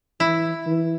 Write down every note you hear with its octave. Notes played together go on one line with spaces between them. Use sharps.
E3 E4
E3